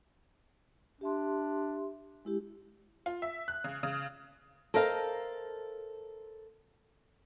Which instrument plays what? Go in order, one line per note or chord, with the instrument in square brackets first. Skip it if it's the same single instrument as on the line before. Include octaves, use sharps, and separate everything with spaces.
[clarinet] D4 [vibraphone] G4 E5 C6
[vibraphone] G#3 E4 G4
[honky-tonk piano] F4
E5
F#6
C#3
C#3
[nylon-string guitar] A4 A#4 C5 D#5 F5